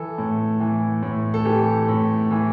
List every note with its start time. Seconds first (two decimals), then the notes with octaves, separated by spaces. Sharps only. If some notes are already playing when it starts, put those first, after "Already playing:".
Already playing: E3 A4
0.18 A2
0.60 E3
1.02 A2
1.34 A4
1.45 E3 G4
1.88 A2
2.31 E3